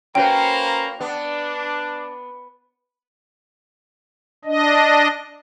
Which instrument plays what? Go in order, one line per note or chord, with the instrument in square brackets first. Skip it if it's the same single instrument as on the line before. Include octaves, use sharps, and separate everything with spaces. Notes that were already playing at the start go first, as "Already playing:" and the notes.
[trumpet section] A#3 C5 A#5 [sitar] C#4 F#4 B4 [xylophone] G5
[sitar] B3 [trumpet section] D4
[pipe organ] D4 D#5